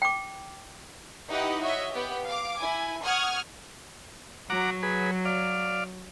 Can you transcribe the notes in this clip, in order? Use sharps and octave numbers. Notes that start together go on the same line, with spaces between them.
G5 D6
D#4 E4 G4 B4 D#5 F#5
F#4 C#5 D#5 E5
B3 G4
F5 D6
E4 G#5
F#5 C#6 D#6 F6 G#6
F#3 F#5 A#5 D6
G#4 B4
D5 F5